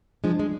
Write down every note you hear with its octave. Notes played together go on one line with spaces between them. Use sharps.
F3 G#3 D4
G#3